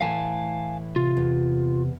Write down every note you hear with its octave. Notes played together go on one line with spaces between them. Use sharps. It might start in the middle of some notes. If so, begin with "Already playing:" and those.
A2 E3 A3 F5 G#5 A5
C3 F4
E2